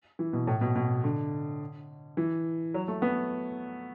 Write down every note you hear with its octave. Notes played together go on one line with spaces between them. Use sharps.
E3
B2
A2
B2
B2
D3
E3
F#3
A3
B3